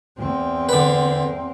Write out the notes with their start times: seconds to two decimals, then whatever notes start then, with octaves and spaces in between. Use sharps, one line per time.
0.18 E2 C4
0.69 D3 B4